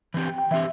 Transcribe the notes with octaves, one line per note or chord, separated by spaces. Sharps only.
E3 C4 G4
G5
G5
E3 C4 G4 E5